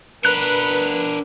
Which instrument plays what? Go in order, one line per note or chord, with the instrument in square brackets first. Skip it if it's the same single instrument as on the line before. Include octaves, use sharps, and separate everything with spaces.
[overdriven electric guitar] D4 A#4 [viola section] B4 [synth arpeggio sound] F#6